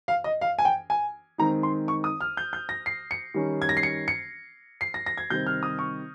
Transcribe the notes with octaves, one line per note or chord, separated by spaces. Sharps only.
F5
D#5
F5
G#5
G5
G#5
D#3 G#3 C4 D#4 A#5
C6
C#6
D#6
F6
G6
G6
A#6
C7
C#7
D#3 G3 C#4
G#6
A#6
C7
C#7
C#7
C7
A#6
A#6
G#6
C3 D#3 G3 C4 G6
F6
D#6
C#6